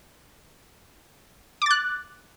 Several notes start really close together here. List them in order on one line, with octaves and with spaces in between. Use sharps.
D6 A6 F#6